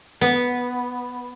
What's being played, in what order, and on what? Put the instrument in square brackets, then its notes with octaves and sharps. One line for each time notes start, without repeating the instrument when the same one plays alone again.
[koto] B3